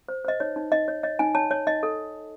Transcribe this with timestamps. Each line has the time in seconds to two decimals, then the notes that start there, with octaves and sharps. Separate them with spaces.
0.09 C5
0.25 C5 D#5
0.40 D#4 C#5
0.56 D#4
0.72 D#4 D#5
0.88 C#5
1.03 C#5 D#5
1.19 D#4 G#5
1.35 C#5 A5
1.51 C#5
1.67 D#4 D#5
1.83 A4